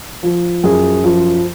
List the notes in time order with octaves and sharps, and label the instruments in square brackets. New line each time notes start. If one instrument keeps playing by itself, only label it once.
[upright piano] F3
F#2 G#4
F3